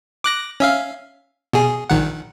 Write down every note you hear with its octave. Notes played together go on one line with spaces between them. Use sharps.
D6 F#6 A#6
C#4 E5 F5
B2 G#4
A#1 D#3 F#5